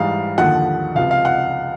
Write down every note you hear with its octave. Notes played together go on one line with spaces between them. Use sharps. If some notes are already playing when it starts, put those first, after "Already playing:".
Already playing: G#2 E3 G3 F5
D#2 D3 F3 F#5
C#2 C3 F3 F5
F5
F#5